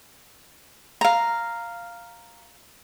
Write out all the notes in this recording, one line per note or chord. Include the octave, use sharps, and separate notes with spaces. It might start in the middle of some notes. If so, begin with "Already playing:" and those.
F5 A#5